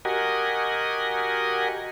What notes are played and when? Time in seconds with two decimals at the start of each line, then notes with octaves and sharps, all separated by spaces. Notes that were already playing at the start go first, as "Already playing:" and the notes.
0.05 F#4 G4 A#4 D#5 F#5 G#5